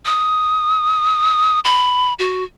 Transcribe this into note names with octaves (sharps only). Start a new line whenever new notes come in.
D#6
B5
F#4